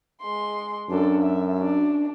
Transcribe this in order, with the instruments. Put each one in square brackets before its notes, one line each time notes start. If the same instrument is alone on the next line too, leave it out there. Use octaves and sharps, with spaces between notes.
[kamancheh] G#3 C6
[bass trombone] F#2 [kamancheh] D4 A4
[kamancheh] E5
D4